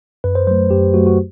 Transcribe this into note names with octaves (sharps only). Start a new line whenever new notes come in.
F#2 B4
C5
F#3 A3 C5
F#2 G4
F#3 A3 F#4
F#4